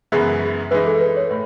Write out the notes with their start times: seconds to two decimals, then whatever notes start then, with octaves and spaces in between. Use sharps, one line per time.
0.12 F#2 C#3 E3 G#3 B3
0.71 E3 G#3 D#4 B4
0.87 A4
1.01 B4
1.17 C#5
1.31 A2